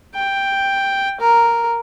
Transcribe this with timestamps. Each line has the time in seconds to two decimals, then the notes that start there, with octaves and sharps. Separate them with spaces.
0.15 G5
1.21 A#4